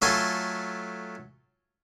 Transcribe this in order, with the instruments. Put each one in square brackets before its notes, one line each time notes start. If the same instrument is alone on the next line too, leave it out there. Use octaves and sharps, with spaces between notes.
[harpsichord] F#3 A3 F4 A4 G#5 C6